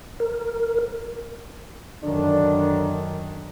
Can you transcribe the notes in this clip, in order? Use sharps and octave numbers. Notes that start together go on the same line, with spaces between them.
A#4
F#2 D3 D#3 D4